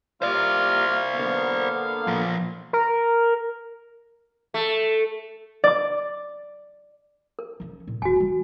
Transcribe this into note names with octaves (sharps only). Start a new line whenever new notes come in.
G3 A#3 F4 C5 D5
D3 A#3 B3 F5
A#2 F3
A#4
A3
D5 D6
A#4
F3 C#4
A#2
E1 F#4 G#5
E3 G3